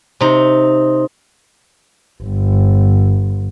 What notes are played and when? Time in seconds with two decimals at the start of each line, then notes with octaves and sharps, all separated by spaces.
0.20 C3 D#4
2.23 G1